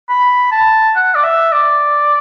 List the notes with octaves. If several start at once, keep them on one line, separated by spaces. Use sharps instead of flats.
B5
A5
F#5
D5
E5
D5